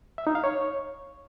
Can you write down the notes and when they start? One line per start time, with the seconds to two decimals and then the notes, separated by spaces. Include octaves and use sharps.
0.18 E5
0.27 D#4
0.35 F5
0.44 C#5